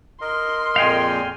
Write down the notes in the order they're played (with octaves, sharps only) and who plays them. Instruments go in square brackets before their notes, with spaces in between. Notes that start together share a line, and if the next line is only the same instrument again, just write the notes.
[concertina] A#4 D#5 [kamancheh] C6
[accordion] F2 A#2 G#3 [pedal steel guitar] F5 G5 G#5